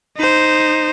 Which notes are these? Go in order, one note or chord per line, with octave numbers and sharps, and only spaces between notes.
D#4 C5